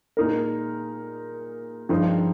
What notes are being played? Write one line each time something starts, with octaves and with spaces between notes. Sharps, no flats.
A#2 G#3 D#4 A#4
G2 F3 G#3 C4 D#4